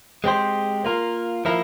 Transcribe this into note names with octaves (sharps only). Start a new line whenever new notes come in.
G#3 C4 G4 C5
A#3 F4 A#4
F3 A#3 E4 A#4